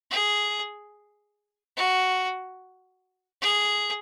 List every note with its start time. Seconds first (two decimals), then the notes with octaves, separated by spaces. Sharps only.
0.11 G#4
1.76 F#4
3.41 G#4